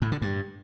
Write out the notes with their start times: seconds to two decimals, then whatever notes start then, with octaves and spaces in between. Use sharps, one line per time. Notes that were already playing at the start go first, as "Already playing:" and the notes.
0.02 A2
0.12 D3
0.22 G2